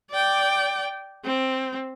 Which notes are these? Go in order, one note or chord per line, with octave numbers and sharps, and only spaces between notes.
D5 G5
C4